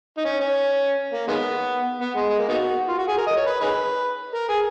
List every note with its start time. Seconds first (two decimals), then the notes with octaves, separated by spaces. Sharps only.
0.18 D#4
0.25 C#4
0.40 C#4
1.13 A#3
1.28 D#3 G#3 B3
2.01 B3
2.15 G#3
2.29 G#3
2.39 A#3
2.49 B3 D#4 F#4
2.88 F4
2.98 F#4
3.08 G#4
3.18 A#4
3.27 D#5
3.36 C#5
3.46 B4
3.61 D#4 G#4 B4
4.34 A#4
4.49 G#4